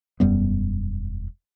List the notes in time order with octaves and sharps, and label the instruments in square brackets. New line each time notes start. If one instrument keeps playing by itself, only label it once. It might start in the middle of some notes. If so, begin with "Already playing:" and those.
[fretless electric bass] E1 F#2 G3 B3